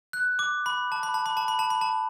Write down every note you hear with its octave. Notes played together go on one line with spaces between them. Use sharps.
F#6
D6
B5
A5
B5
A5
B5
A5
B5
A5
B5
A5